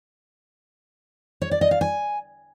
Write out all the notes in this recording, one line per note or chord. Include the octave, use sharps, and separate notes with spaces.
C#5
D5
D#5
F5
G#5